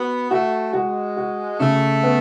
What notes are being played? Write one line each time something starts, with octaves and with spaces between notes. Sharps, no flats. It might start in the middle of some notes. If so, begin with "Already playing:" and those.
Already playing: B3 F#4
A3 F#4
G#3 F#4
F#4
C#3 A3
B3